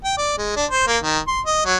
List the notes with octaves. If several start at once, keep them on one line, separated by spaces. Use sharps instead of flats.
G5
D5
G#3
D4
C5
A#3
D#3
C6
D#5
F#3